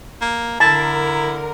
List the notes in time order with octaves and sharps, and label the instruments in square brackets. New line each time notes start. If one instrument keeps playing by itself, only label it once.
[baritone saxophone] A#3
[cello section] D3 A#4 [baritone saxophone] E4 [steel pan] A5